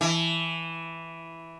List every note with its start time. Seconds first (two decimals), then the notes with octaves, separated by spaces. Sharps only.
0.01 E3